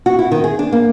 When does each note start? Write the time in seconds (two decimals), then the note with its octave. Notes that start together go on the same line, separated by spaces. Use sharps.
0.06 F#4
0.19 E4
0.32 D#3
0.44 G#4
0.59 D4
0.72 A#3